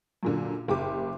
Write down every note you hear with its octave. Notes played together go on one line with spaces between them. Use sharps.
F#2 A#2 D3
F#1 G4 D6